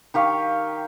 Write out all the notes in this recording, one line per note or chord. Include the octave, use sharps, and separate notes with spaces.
D#3 G4 F5 C#6